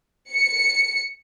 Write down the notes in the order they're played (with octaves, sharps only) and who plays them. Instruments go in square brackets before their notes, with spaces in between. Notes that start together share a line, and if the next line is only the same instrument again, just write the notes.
[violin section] C#7